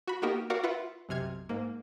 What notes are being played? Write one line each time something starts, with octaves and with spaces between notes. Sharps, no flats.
F#4 B5
A#3 B3 D#4 F#4 G4 A#4
F#4 A#4 D5 F5 F#5
F4 B4 E5 F#5
B1 F#2 C3 F6 G#6
G#2 A#3